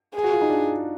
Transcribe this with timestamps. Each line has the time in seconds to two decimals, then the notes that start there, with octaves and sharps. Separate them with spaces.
0.15 G#4
0.23 F#4
0.32 F4
0.41 D#4
0.50 D4